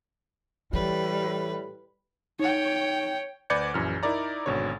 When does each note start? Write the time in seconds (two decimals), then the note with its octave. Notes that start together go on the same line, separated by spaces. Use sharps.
0.73 A2 E3 G3 B4
2.39 D#4 C#5 G5
3.50 D2 B4 D5 G6 G#6 C#7
3.74 A#1 F#2 E3 F6
4.03 D#4 E4 A#4 D5 A#5
4.46 G#1 B2 D3 C#5